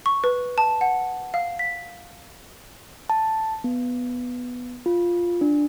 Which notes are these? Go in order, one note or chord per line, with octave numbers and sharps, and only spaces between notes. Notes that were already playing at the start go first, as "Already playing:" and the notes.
C#6
B4
A5
F#5
F5
B6
A5
B3
F4
D4